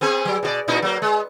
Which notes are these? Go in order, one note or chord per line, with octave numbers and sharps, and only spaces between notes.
B3 C4 G#4
F#3
B2 F#4 D5
A#2 D#4 E4
F#3 A#3
G#3